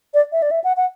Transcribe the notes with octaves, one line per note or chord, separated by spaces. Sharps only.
D5
E5
D5
E5
F#5
F#5